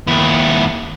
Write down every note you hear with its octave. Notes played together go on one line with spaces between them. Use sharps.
D#2 E4